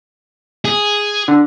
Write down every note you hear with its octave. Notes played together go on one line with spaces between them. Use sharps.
G#4
D3